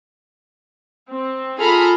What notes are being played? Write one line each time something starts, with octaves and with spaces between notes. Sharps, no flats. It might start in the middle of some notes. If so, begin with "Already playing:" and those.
C4
F4 G#4 A4 A#5 B5 F6